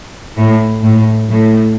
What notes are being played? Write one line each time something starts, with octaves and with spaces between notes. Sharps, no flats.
A2
A2
A2